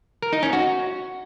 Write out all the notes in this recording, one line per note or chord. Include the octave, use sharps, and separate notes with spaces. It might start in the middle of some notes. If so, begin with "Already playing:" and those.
A#4
D#4
C#4
F#4